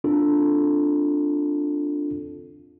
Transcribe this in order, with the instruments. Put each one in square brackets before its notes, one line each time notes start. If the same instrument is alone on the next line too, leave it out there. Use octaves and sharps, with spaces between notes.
[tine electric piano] C4 D4 F4 A4